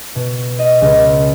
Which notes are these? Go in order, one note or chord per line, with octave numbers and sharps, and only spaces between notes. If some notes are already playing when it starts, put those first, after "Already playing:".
B2
D#5
C#2